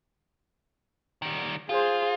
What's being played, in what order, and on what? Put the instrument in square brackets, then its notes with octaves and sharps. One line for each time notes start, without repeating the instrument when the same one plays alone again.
[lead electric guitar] D#3 G3
[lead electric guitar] F4 [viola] G#4 C5